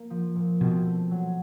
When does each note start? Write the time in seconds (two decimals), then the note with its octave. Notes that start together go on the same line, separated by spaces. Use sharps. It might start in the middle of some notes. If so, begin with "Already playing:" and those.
Already playing: A#3
0.10 F3
0.36 A#2
0.61 B2 C4
0.86 A3
1.11 F#3